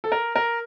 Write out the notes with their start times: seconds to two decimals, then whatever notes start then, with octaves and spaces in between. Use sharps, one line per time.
0.04 A4
0.12 A#4
0.36 A#4